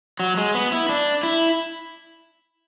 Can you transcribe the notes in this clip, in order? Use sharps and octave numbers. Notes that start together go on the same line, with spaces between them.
F#3
G#3
B3
E4
D4
E4